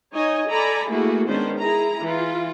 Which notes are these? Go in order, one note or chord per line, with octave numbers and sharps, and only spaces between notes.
D#4 C#5 D#5 G#5
A4 D5 G#5 A#5 B5
A3 A#3 E4 F#4 G#4
D#3 G#3 B3 C#4 D4 C5
E4 G#4 A#5
E3 F4